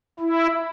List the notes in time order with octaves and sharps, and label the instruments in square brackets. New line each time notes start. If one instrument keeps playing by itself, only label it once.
[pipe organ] E4